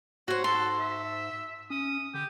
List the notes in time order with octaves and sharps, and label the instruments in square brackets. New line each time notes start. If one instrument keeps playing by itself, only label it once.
[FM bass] G#2 [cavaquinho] F#4 C5 [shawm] C#5
[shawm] A4 [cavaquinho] C6
[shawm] E5
[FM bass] C#4 [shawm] D#6
[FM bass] D3 [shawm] G4